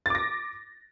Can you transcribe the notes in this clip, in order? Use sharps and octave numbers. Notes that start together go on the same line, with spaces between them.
D6 A6 A#6